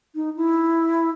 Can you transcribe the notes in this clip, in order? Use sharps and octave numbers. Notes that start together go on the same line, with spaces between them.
D#4
E4